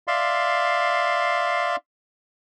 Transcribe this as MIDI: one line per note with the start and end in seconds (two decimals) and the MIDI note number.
0.08 1.76 74
0.08 1.76 76
0.08 1.76 77
0.08 1.76 84